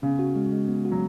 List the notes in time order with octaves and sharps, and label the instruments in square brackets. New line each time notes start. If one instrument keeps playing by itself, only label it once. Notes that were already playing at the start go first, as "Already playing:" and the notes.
[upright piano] C#3 [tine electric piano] B3
[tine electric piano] F#4
G#3
G#3
B3
F#4
[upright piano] F#3